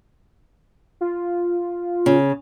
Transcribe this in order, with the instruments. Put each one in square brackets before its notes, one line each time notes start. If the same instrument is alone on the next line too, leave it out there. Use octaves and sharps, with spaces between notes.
[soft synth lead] F4
[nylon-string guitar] C#3